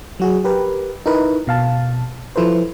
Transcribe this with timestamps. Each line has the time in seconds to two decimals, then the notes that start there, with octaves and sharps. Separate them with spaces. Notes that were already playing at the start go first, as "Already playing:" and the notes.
0.20 F#3 F#4 G#4
0.44 G4 A#4 B4
1.06 D#4 E4 A#4 B4
1.47 B2 F5 A5
2.36 F3 E4 A4 B4 C5